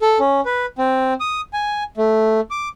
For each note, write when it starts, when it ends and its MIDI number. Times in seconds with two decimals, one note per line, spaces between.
0.01 0.18 69
0.19 0.41 61
0.45 0.66 71
0.78 1.14 60
1.20 1.41 87
1.53 1.83 80
1.97 2.40 57
2.51 2.69 86